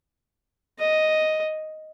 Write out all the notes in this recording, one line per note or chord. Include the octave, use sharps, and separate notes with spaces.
D#5